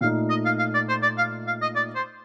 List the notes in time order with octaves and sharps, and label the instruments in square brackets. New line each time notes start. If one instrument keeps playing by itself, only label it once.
[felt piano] A#2 A3 D#4 [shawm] F5
[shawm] D#5
F5
F5
D5
C5
D5
F5
F5
D#5
D5
C5